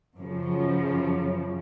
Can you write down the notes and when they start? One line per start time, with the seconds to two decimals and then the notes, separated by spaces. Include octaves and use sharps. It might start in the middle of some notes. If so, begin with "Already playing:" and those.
0.17 F#2 C#3 F3